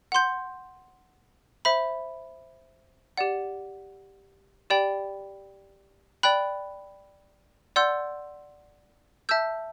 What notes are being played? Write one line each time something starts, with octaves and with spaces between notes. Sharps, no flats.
F#5 C6 G6
C5 E5 B5
G4 D5 F#5
G4 D5 G5 B5
D5 G5 B5 F#6
D5 F#5 C6 E6 G6
E5 A5 E6 G6